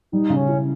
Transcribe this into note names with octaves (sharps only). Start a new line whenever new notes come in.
G3 D#4
C#3
C#4
E4